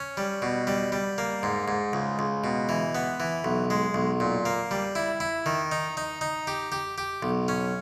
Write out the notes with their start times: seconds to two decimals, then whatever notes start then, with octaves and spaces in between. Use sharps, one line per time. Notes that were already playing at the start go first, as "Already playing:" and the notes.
Already playing: C#4
0.17 G3
0.42 B2
0.67 G3
0.92 G3
1.18 A#3
1.43 G#2
1.68 G#2
1.93 C#2
2.19 C#2
2.44 B2
2.69 E3
2.95 B3
3.20 E3
3.44 B1
3.70 G#3
3.94 B1
4.20 A#2
4.45 A#3
4.71 G3
4.95 E4
5.20 E4
5.46 D#3
5.72 D#4
5.97 D#4
6.21 D#4
6.47 G4
6.72 G4
6.98 G4
7.23 B1
7.48 C#4